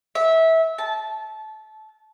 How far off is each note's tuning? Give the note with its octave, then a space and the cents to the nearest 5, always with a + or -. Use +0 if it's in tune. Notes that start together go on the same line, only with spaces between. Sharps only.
E5 -20
A5 -20